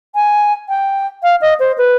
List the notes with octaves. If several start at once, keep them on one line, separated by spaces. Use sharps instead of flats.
G#5
G5
F5
D#5
C5
B4